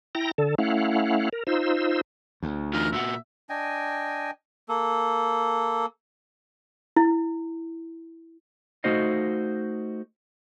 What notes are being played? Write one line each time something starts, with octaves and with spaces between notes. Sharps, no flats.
E4 G5 A#5 A#6
D3 A4
A3 C#4 E4 F5 F#5
A#4
D#4 F4 C5 E6
D2
E3 D#4 F4 A#4
A#2 F#4 E5 F#5
D4 D#5 G5 G#5
A#3 A4
E4
A3 D#4 F#4 C5 D#5 F5